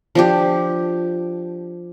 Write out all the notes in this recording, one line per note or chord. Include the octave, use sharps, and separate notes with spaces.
F3 D4 G4